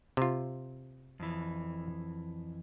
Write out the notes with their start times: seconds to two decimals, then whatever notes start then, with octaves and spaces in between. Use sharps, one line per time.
0.17 C3 F4
1.20 F2 E3